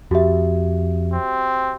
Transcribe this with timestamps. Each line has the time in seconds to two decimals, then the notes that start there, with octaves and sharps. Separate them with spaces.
0.11 F2 F#4 G4 E5
1.13 C4